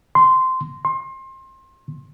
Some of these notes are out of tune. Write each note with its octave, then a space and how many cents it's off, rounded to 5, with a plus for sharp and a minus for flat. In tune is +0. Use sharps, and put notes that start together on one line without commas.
C6 -15
C6 +25